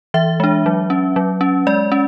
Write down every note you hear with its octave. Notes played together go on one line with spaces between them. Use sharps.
E3 E5
G#3 D4
F#3
C#4
F#3
C#4
G#3 D5
C#4